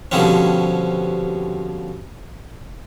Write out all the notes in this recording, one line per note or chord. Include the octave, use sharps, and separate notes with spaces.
B2 D3 F3 G3 C4 C#4